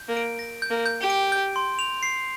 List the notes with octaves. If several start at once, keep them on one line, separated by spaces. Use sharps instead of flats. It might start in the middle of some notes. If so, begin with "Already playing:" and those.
Already playing: G6
A#3
D7
A#6
G6
A#3
G6
G4
D7
G6
C6
F7
C7